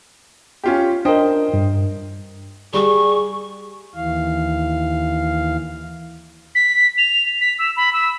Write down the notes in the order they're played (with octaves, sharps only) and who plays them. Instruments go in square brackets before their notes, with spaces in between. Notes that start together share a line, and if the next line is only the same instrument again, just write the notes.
[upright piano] C#4 F4 G4
[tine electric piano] D4 A#4 [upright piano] C5 D#5 G5
[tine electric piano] G2
[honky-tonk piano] G3 [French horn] G#4 [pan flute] C#6
[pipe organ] D#2 E3 F5
[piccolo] B6
F7
B6
E6
B5
E6